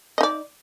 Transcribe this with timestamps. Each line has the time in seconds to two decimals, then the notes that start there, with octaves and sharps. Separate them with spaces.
0.18 D#5
0.21 D#4
0.23 D5